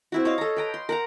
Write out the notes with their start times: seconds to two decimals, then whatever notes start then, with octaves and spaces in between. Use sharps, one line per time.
0.12 C4 E4 F#4
0.25 C#5 D#5 F5
0.38 A4 A#5
0.56 B4 G5 A#5
0.74 C6
0.89 A#4 F#5 A#5